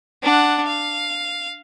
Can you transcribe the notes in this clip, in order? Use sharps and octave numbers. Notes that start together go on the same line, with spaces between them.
D4 F#5
F5